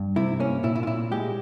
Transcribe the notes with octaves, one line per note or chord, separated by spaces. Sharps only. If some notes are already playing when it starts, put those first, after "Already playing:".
Already playing: G2
C3 E4
A#3 C#4
A#2 E4
E4
F4
A#2 E4
G#3 G4